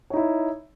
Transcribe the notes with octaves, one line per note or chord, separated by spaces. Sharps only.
D#4 E4 C#5